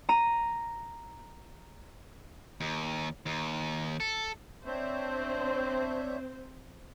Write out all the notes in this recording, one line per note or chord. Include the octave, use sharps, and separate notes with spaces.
A#5 D#7
D#2
D#2
A4
C4 D4 C5 C#5 E5